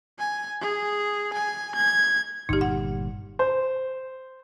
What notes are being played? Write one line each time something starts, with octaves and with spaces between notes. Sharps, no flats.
G#5
G#4
G#5
G#6
G1 A#2 D#4 G4
F#5
C5